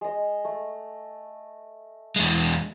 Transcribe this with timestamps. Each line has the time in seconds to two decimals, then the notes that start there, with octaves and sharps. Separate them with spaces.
0.01 G#3 D#5
0.45 A3
2.16 E2 G#3